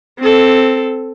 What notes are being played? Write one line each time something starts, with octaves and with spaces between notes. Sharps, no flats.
C4 A4